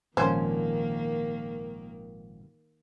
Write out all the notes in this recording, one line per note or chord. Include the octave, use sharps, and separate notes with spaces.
G#1 A#2 D#3 F3 A#3 C#4 C5